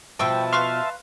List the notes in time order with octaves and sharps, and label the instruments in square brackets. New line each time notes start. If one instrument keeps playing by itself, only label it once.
[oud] B2 F3 [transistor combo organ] E5 A5 [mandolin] G5 C#6 E6
[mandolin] B4 F5 C#6 [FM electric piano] C6 F6